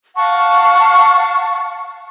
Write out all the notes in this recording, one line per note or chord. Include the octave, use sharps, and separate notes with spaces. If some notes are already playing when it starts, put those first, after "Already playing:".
F5 F#5 A5 C#6